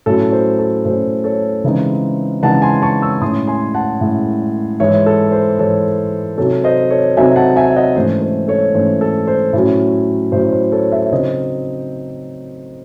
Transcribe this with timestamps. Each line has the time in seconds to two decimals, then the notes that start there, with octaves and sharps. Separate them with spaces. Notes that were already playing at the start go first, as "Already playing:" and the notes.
0.06 A2 F#3 C#4 A4
0.32 C5
0.59 A4
0.85 A2 F#3 C#4 C5
1.24 A4 C#5
1.64 C#3 E3 G#3 C4 D#4
2.42 C#3 E3 G#3 C4 D#4 F#5 A5
2.62 G#5 C6
2.82 A5 C#6
3.02 C#6 E6
3.21 A2 G#3 C#4 C6 D#6
3.48 G#5 C6
3.74 F#5 A5
4.01 A2 G#3 C#4
4.80 G#2 E3 G#3 C#5 E5
5.06 A4
5.32 C5
5.59 G#2 E3 G#3 A4 C#5
6.37 C3 F#3 C4 D#4 A4 C#5
6.64 C5 D#5
6.91 A4 C#5
7.17 C3 F#3 C4 D#4 E5 G#5
7.36 F#5 A5
7.56 E5 G#5
7.76 D#5 F#5
7.95 G#2 E3 A3 C#4 C5
8.22 C5
8.48 A4 C#5
8.74 G#2 E3 A3 C#4 C5
9.01 A4
9.28 C5
9.53 A2 F#3 C#4
10.32 A2 F#3 C#4 C5
10.53 C5
10.72 A4 C#5
10.92 C#5 E5
11.12 C#3 F#3 C4 D#4 C5 D#5